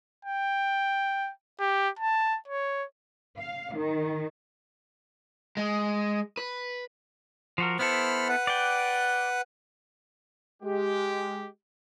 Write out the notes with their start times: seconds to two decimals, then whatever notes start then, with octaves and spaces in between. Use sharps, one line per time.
0.25 G5
1.60 G4
1.99 A5
2.48 C#5
3.39 F5
3.78 D#3
5.57 G#3
6.37 B4
7.58 F3 F#4 A#4
7.79 B3 E4 A4 C5 B5 F6
8.29 B4 F#5
8.47 D5 G5
10.63 G#3 G4